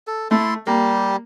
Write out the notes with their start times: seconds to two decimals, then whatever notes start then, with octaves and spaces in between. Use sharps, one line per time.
0.07 A4
0.31 A3 E4 A4 C6
0.67 G3 A#3 G4